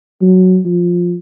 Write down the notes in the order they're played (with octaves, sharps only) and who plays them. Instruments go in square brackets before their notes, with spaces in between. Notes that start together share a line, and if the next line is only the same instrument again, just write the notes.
[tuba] F#3
F3